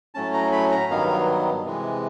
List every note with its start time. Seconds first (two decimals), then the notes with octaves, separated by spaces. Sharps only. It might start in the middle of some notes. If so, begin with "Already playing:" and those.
0.15 A2 F#3 A3 C#4 A5
0.34 A#5
0.52 B5
0.72 A#5
0.90 G2 D#3 F#3 B3 F5
1.65 C3 E3 G#3